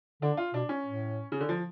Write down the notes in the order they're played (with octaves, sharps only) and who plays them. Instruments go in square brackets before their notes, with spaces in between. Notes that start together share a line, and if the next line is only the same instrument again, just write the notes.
[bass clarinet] D3 [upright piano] D4
[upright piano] F4
[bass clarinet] B2 [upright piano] D4
[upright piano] C#4
[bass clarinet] A2
[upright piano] C#3
D3
F3